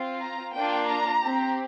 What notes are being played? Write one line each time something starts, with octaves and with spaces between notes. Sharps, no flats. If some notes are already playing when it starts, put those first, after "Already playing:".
Already playing: C4 F4
A#5
A#3 D4 F4 G5
A#5
C4 G4